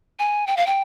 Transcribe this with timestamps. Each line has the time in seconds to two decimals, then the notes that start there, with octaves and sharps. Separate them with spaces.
0.19 G#5
0.47 G5
0.57 F5
0.66 G5